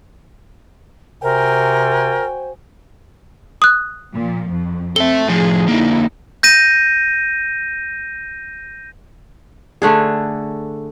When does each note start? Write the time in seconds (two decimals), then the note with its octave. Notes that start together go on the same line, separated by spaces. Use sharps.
1.23 C3 F#4 A#4 C5 G5 G#5
3.62 D#6 F#6
4.16 A#2 F3
4.50 F2
4.96 C4 A4 E5 G7
5.28 A2 F3 G#4
5.68 D3 A#3 D#4 E4
6.43 G6 A#6 D#7
9.82 D3 A3 D4 G#4